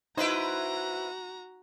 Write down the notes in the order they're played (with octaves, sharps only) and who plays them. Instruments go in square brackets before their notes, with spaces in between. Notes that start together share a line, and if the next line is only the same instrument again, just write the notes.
[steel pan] D#4 [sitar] E4 B4 C5 [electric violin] F#4 A#5